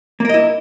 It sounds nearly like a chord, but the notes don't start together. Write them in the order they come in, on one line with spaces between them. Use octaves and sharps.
A#3 A#4 D#5 E4